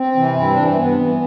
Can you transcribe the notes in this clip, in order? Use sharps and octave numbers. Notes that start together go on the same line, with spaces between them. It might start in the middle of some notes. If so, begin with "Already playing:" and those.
Already playing: C4
C3 E3
G2 E4
D4
E3
C4
G2 B3
E3